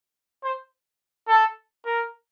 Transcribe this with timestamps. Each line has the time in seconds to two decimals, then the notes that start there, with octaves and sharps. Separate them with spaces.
0.44 C5
1.28 A4
1.85 A#4